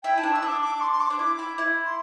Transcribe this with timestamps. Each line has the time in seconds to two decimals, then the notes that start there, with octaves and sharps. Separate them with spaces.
0.03 E4 G5
0.18 E4 A5
0.23 D4
0.33 E4 E6
0.43 D4 D6
0.61 D6
0.81 C6
0.92 C6
1.00 D6
1.10 D4
1.19 E4 D6
1.39 E4
1.58 E4
1.85 C6